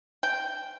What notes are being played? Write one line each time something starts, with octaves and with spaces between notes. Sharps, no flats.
G5